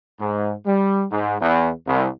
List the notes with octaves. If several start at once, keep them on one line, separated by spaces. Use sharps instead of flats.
G#2
G3
G#2
E2
C2